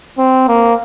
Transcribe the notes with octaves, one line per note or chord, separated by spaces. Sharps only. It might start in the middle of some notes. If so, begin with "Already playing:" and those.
C4
A#3